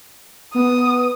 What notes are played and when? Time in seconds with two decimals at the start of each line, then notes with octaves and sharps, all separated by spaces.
0.55 B3 D#6